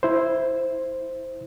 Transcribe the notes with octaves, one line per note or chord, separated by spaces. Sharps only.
E4 C5